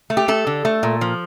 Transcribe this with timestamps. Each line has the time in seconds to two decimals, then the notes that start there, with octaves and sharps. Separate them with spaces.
0.10 A3
0.17 G4
0.28 A3 A4
0.47 D3
0.65 A3
0.83 A#2
1.01 F3